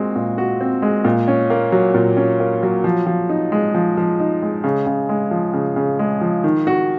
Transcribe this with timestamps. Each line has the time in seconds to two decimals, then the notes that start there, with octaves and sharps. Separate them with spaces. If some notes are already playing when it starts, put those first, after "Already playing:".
Already playing: A#2 G#3 C4 F#4
0.15 A#2
0.38 F#4
0.61 C4
0.82 G#3
1.04 A#2
1.28 C#4
1.50 A#3
1.72 F#3
1.94 A#2
2.17 C#4
2.40 A#3
2.63 F#3
2.84 F3
3.07 F3
3.29 D#4
3.52 G#3
3.74 F3
3.97 F3
4.20 D#4
4.42 G#3
4.64 C#3
4.86 C#3
5.09 G#3
5.31 F3
5.53 C#3
5.76 C#3
5.99 G#3
6.21 F3
6.44 D#3
6.67 F#4